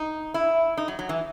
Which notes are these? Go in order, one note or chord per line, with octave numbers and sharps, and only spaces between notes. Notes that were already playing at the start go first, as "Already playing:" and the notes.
Already playing: D#4
E4
D#4
F#3
F#3
E3